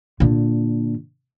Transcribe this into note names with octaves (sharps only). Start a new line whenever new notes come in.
A#2 D3